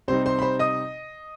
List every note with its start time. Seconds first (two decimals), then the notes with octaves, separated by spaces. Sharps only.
0.08 C3 G3 C4 D#4 C5 C6
0.26 C5 C6
0.39 B5
0.42 C5 C6
0.59 D#5 D#6